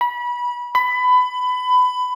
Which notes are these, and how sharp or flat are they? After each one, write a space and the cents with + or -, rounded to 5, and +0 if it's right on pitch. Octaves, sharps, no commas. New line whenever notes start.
B5 -25
B5 +20